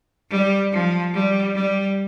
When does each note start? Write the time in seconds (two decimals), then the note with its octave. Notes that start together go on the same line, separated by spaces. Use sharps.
0.30 G3
0.72 F3
1.13 G3
1.55 G3